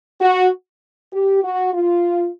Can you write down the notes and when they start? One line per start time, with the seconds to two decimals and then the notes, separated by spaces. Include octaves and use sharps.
0.20 F#4
1.13 G4
1.43 F#4
1.73 F4